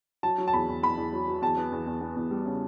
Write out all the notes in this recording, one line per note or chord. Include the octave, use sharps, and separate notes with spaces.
F#3 A5
F#3
A5
E2 B5
E2
E2 B5
E2
F#3
F#3
E2 A5
B3
E2
E2
B3
E2
G3
C#3